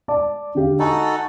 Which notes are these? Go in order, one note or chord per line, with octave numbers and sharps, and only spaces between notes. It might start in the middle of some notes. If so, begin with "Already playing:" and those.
D5 A5 D6
D3 G4 F5
D#4 F#4 A4 G#5 B5